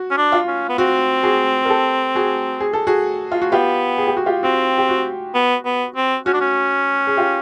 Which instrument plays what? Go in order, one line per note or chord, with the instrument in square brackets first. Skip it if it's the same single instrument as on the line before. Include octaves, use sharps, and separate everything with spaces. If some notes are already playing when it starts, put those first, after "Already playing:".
Already playing: [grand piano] F#4
[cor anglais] C#4
D4
[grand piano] F4
[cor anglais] C#4
B3
[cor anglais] C4 [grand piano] F#4
[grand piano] F#4 G#4
A#4
G4 A4
F#4 G#4
G#4
A4
F#4 G#4
F4
F#4
[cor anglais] B3 [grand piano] F4 G4
[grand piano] G#4
G4
F#4
F4 G4
[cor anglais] C4 [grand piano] F#4
[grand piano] G4
F#4
[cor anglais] B3
B3
C4
[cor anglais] C#4 [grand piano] F#4
[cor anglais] D4
C#4
[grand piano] G#4
F4 G4